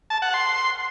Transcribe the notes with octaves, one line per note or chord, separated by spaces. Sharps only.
A5
F#5
C6